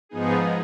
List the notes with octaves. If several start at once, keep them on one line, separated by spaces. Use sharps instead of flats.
G#2 F3 B3 D#4 G#4